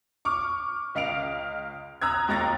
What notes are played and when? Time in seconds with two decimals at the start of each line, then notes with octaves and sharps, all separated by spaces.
0.25 C#6 D6 F6
0.95 C#2 D#5 F5 F6 D7 F7
2.02 A#5 D#6 E6 F#6 G#6
2.28 D#2 G#3 A#5 A6 A#6